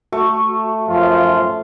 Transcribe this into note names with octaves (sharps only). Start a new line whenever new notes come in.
A3 F#4 C#6
F#2 F3 F4